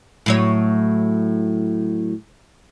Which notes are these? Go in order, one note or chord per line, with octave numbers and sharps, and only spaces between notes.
A2 F#3 C#5